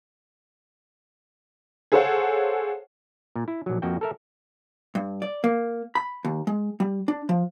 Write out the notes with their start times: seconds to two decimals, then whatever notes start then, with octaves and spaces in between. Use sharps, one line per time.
1.92 G#4 A4 C5 C#5 F5 F#5
3.36 A#2
3.48 E4
3.66 A#1 F#3
3.82 F2 A#3 F#4 G5
4.01 A4 A#4 E5
4.95 G2
5.22 D5
5.44 A#3
5.95 B5
6.25 D#2
6.47 G#3
6.80 G3
7.08 D4
7.29 F3